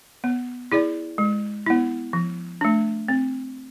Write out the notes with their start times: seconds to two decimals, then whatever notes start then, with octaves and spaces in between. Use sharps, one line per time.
0.24 B3
0.72 E4 G#4 D5
1.18 G#3
1.66 B3 E4
2.13 F3
2.61 A3 D4
3.09 C4